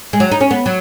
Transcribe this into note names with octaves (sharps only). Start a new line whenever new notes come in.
G#3
F#3
D#4
C#4
B3
F#3